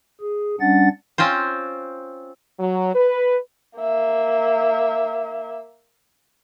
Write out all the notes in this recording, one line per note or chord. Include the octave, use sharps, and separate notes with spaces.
G#4
G3 C#4 D4 F#5 A6
C4 C#4 F4 C5
F#3
B4
A#3 E5